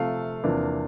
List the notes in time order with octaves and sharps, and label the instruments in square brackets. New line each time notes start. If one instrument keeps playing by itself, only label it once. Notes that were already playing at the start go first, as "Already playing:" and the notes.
Already playing: [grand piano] C3 F3 A3 F5
E2 C3 F3 A#3 D4